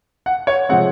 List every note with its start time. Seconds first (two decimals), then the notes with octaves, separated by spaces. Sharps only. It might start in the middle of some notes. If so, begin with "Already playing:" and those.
0.26 F#5
0.47 C#5
0.69 C3 F3 G#3 C4 F#5